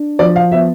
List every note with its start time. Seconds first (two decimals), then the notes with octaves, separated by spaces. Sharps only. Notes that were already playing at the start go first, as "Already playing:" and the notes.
Already playing: D4
0.19 F3 D5
0.36 F5
0.52 B3 E5